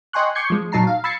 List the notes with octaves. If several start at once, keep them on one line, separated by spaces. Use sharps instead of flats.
D#5 G5 G#5 C6 C#6 F#6
C#6 D6 G6 G#6 C7 C#7
F3 G#3
A#2 F#3 D#4 A5 A#5 C7
F5
B5 E6 G#6 A6 C7 C#7